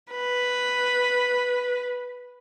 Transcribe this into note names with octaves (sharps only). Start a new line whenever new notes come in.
B4